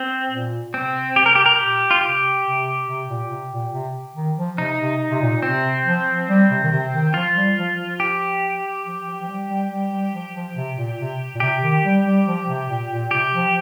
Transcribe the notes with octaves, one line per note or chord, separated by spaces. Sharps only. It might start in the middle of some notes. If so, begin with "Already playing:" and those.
Already playing: C4
A#2
C3 C4
C3 G4
A#4
G4
A#4
A#2 G4
F4
C3 G4
C3
C3
A#2
C3
A#2
C3
D#3
F3
C3 D#4
C3
C3
A#2
C3 C4
F3
G3
C3
D#3
C3
D#3
F3 F4
G3
F3
F3
G4
F3
F3
F3
G3
G3
G3
G3
F3
F3
C3
A#2
C3
A#2
C3 G4
D#3
G3
G3
F3
C3
A#2
A#2
C3 G4
F3